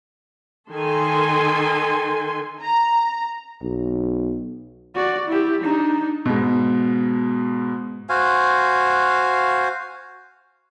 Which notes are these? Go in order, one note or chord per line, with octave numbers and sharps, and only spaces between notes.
D#3 A4 G#5 C6
A#5
B1
F#4 D5
E4 G4
D4 D#4
G#2 B2
F#4 C5 F5 G#5